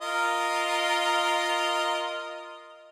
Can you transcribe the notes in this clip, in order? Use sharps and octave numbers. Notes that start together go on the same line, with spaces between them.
F4 A#4 D#5